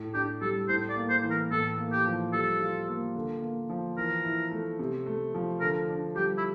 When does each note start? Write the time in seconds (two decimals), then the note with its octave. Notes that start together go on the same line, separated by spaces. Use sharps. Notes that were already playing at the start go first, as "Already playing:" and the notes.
Already playing: A2
0.14 D4 G4
0.42 G3 A4
0.69 A2 C5
0.90 D5
0.96 A#3
1.10 C5
1.24 E3
1.31 A#4
1.51 A2 A4
1.78 A#3
1.92 G4
2.06 F3
2.33 G3 A4
2.61 F4
2.87 A#3
3.15 D3
3.42 A#3
3.70 F3
3.97 E3 A#4
4.24 E4
4.51 A3
4.79 C3
5.06 A3
5.34 F3
5.61 D3 A#4
5.89 D4
6.16 G3 G4
6.38 E4